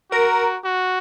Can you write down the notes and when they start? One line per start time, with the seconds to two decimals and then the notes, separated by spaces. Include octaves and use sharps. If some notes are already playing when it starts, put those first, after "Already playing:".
0.11 F#4 A#4
0.64 F#4